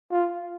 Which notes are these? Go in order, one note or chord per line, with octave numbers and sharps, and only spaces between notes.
F4